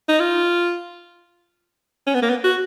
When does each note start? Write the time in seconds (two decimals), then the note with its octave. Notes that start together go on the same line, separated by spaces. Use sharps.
0.09 D#4
0.20 F4
2.07 C#4
2.14 B3
2.22 A#3
2.30 B3
2.44 F#4